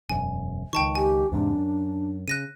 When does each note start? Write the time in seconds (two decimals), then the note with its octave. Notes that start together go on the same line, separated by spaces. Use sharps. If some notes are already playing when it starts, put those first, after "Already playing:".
0.09 E1 F#2 G#5
0.73 C#2 D#3 G5 A5 C#6
0.95 G4 G#5
1.32 E2 G#2 C3 D4
1.53 F#2
2.28 C#3 F#6 A#6 D#7